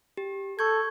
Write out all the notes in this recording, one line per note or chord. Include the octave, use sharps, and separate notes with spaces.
G4
A4 C#6 G6 G#6